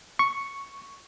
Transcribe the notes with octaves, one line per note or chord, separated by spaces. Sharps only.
C#6